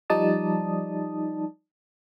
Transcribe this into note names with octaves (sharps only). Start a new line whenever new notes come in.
F3 G3 D#4 D5 A5 D#6